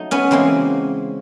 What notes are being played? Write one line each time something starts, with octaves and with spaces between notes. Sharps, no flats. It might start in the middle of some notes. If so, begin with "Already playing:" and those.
Already playing: F#3 A3 D#4
B3 C#4
C#3 E3 G#3 A#3 C4